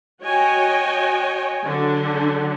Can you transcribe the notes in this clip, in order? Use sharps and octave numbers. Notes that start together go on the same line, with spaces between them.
F#4 C#5 D#5 G5 G#5
D3 F#3